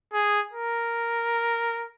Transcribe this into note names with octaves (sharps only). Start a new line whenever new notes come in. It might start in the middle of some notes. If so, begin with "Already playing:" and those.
G#4
A#4